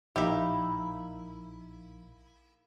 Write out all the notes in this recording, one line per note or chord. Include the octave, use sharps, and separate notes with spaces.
A#1 A#3 D#4 E4 G4 E5